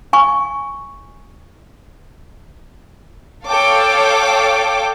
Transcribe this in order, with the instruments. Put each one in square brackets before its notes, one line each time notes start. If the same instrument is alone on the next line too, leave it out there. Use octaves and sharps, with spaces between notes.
[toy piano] G#5 C#6
[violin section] A4 C#5 F5 G5 D6